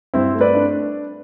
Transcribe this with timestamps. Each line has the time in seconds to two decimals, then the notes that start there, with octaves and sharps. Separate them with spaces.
0.14 G2 C4 E4
0.34 A3
0.41 B4 D5
0.55 D4